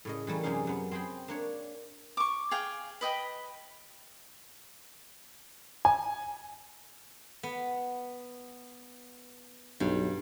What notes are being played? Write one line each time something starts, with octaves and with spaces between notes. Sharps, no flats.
A2 C#3 D#5
E3 G3 A3 A#3
F#2 C3 G#3 C#4 D#4 F5
F#2 B3
C4 G#4 C5 G5 B5
A#3 D4 C#5
C#6 D6
G#4 F5 G5
B4 D#5 G5 B5
G#5
B3
B1 G2